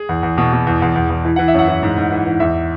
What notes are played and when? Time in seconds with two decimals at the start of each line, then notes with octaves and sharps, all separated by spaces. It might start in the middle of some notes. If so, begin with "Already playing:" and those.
Already playing: G#4
0.09 E2
0.23 E2
0.38 B2
0.53 B2
0.67 E2
0.82 E2
0.96 E2
1.10 E2
1.25 E3
1.36 E3 F#5
1.48 E5
1.54 F#2 F#5
1.68 E3
1.83 G#2
1.98 G#2
2.12 E3
2.26 E3
2.40 E2 E5